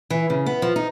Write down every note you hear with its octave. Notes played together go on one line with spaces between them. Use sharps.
E3
C#3
B3
F3
D#4